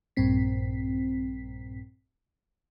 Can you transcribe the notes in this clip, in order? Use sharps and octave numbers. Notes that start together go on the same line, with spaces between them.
A#1 G2 A#2 C4 B6